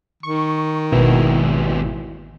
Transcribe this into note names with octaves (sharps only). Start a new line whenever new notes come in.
D#3 C#6
G#1 D#2 B2 E4